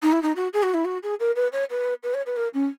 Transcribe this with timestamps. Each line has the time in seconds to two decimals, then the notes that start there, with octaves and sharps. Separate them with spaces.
0.03 D#4
0.12 E4
0.23 D#4
0.36 F#4
0.54 G#4
0.63 F#4
0.74 E4
0.85 F#4
1.03 G#4
1.20 A#4
1.36 B4
1.53 C#5
1.70 B4
2.03 B4
2.14 C#5
2.26 B4
2.36 A#4
2.54 C#4